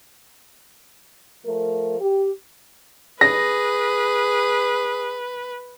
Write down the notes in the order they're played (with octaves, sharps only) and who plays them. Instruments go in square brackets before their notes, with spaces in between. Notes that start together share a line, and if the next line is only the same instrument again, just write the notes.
[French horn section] F3 A3 A#4
G4
[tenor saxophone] G#4 [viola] B4 [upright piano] A#6